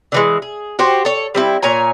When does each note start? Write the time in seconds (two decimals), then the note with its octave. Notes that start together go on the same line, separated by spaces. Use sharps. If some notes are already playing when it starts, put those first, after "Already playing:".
0.12 D3 E3 G#3
0.42 G#4
0.79 F#4 G4 C5
1.05 A4 C#5
1.35 G3 C4 E4
1.63 A#2 C#5 G#5 A#5